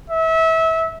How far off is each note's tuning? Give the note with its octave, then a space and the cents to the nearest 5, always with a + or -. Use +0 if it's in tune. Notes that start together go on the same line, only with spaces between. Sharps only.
E5 -25